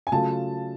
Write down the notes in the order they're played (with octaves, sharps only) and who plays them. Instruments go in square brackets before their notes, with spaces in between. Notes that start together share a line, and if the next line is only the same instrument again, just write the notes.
[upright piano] G#5
[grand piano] C#3 F#3 A3 F4 [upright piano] A5